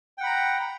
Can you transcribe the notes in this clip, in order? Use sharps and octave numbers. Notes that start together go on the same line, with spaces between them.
F#5 G5 A#5 B5